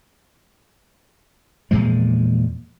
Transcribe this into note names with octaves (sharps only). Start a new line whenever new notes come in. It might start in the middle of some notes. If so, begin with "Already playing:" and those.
E2 A#2 F3 G#3